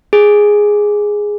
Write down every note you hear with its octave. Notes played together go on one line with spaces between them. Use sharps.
G#4